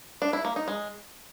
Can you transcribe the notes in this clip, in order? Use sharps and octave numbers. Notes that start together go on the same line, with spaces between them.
D4
E4
A#3
D#4
G#3